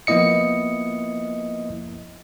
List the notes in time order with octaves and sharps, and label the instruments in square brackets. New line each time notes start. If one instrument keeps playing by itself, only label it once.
[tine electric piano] F3 A#3 B3 E4 D#5 C#7